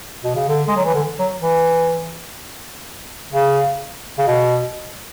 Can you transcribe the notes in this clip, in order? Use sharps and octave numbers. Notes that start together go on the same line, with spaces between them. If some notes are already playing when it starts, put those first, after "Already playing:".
B2
C#3
D3
G#3
F#3
E3
D3
F#3
E3
C#3
C#3
B2